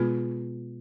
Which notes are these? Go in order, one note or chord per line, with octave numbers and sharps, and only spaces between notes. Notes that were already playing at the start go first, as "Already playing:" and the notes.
Already playing: B2 G#3 B3 F4 G#4